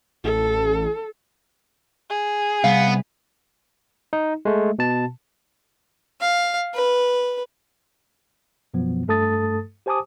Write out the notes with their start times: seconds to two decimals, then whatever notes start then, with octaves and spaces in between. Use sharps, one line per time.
0.24 A1 A4
2.10 G#4
2.64 C2 B3 F5
4.13 D#4
4.45 G#3 A3
4.79 B2 A5
6.21 F5
6.75 B4
8.74 F#2 B2 F3 F#3 B3
9.08 G2 A3 A4 A5 D#6 A6
9.86 G4 C5 G#5 A5 D6 D#6